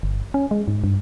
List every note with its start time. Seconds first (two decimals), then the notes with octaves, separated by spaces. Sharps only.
0.03 G1
0.34 C#4
0.51 G#3
0.68 G#2
0.84 G2